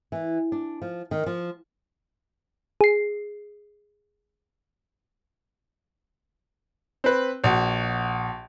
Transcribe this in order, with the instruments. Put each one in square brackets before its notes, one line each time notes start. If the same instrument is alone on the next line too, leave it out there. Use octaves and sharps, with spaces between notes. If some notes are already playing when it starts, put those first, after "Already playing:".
[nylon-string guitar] E3
D4
F3
D#3
F3
[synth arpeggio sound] G#4 C7
[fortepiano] C4 B4
A#1 F#4